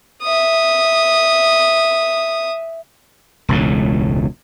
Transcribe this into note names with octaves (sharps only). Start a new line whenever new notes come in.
E5 D#6
E1 C#2 A2